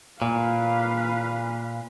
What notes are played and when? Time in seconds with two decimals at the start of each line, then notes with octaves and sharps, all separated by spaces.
0.22 A#2 B4 F5